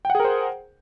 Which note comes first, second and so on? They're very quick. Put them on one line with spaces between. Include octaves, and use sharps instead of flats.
G5 F#5 G#4 A#4 C5